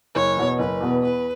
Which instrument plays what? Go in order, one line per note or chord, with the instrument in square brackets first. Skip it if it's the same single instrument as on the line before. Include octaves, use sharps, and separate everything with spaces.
[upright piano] F#1 [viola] C#5
[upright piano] E2 B2
[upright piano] F#1 [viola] B4
[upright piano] E2 B2
[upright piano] E2 [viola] B4